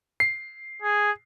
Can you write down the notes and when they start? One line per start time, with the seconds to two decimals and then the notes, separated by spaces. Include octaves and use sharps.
0.20 C7
0.82 G#4